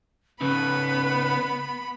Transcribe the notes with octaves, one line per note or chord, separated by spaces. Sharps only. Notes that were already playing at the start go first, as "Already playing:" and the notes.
C#3 B3 C#4 D#4 B4 B5